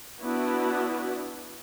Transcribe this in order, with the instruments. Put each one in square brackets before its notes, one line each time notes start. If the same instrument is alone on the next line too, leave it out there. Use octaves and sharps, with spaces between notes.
[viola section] B3 D4 E4 F#4